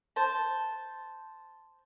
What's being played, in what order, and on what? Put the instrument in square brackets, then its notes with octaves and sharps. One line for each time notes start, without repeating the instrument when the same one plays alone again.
[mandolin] C5 A5